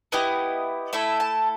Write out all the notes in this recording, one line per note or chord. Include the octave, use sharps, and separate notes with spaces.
B3 E4 G4 D#5
A3 E4 A4 E5
A5